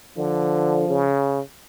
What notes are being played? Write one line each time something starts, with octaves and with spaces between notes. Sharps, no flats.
D3 F3
C#3